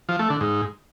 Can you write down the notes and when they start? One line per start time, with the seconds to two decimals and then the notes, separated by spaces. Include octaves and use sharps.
0.09 F3
0.19 A3
0.30 D3
0.41 G#2